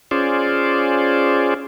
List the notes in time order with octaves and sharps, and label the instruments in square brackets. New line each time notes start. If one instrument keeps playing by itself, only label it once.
[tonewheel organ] C#4 F4 G#4 C5 D5